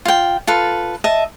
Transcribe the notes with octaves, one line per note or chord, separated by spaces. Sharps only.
F4 G5
F4 A4 B4
D#5 E5 A5